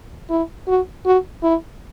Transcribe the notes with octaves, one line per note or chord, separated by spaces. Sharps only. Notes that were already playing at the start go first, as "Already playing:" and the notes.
E4
F#4
F#4
E4